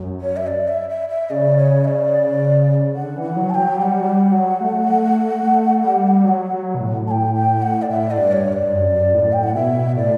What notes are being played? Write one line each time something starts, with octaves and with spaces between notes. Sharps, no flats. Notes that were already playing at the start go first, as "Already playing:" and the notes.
Already playing: F#2
C#5
E5
D5
E5
E5
E5
C#3 D5
C#5
E5
D5
D3 F#5
E3
F#5
F#3
A5
F#3 G5
G3 G5
F#5
F#3
G3
F#3
A3
A3
G3
F#3
F#3
B2
A2
A2 G5 A5
G5
F#5
D5
A2 E5
D5
G2
C#5
G2
D5
G2
F#2
A2
G5
F#5
B2 E5
A2 D5